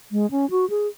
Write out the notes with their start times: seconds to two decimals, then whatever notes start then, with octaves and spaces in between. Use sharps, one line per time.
0.12 G#3
0.31 C#4
0.50 F#4
0.70 G#4